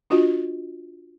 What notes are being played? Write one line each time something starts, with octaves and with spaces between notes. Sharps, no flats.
D4 F4 F#4 D#5